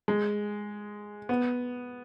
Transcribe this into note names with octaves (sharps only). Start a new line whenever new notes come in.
G#3
B3